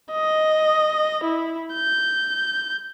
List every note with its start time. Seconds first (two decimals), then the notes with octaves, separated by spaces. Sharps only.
0.11 D#5
1.24 E4
1.74 G6